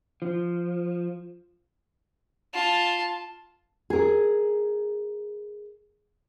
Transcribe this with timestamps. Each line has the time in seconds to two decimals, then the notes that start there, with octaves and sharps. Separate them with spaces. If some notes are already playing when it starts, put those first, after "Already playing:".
0.22 F3
2.54 F4 A5
3.90 G#4 A#4